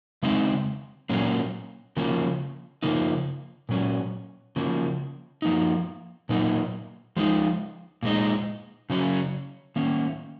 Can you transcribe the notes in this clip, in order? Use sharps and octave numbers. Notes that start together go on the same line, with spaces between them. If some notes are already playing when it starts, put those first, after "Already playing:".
C#3 G#3 C4 D#4
A#2 F#3 A#3 C#4
C#3 F3 A#3
C#3 F3 A#3 D#4
A#2 F#3 C#4
C#3 F3 A#3
F3 A#3 D#4
A#2 F#3 A#3 D#4
F3 G#3 D#4
A#2 G#3 D#4
C#3 F#3 C#4
D#3 A#3 C#4